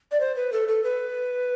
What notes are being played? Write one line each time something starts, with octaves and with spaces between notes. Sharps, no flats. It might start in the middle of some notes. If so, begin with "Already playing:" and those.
D5
C5
B4
A4
A4
B4